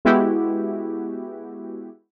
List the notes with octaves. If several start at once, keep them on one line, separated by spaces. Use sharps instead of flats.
G#3 B3 E4 F#4 G4